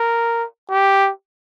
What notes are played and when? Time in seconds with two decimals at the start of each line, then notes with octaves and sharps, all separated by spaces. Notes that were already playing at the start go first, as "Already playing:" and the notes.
Already playing: A#4
0.70 G4